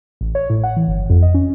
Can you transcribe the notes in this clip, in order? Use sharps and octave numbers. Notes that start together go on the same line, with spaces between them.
A1
C#5
A2
F#5
E3
G1
F2
D#5
C#4